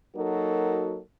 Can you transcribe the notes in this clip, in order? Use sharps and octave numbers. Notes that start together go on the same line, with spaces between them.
F#3 A#3 D#4 F#4 A4 A#4